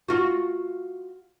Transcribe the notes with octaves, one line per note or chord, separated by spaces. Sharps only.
F4 F#4